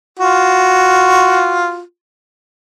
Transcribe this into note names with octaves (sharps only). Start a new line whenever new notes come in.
F4 F#4